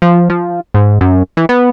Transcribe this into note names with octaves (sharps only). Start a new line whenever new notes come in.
F3
F3
G#2
F#2
E3
B3